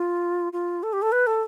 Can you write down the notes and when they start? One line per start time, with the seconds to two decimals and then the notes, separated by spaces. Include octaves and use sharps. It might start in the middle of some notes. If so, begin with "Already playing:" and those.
Already playing: F4
0.53 F4
0.83 A4
0.93 G4
1.02 A4
1.12 B4
1.27 A4